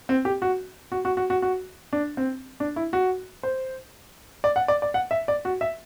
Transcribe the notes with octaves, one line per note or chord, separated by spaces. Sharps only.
C4
G4
F#4
F#4
F#4
F#4
F#4
F#4
D4
C4
D4
E4
F#4
C5
D5
F#5
D5
D5
F#5
E5
D5
F#4
E5